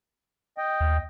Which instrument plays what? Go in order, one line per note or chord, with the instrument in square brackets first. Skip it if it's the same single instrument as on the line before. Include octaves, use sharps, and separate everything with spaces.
[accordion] D#5 G5
[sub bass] D#2